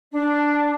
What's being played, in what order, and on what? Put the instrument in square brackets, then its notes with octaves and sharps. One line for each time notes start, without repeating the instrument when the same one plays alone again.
[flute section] D4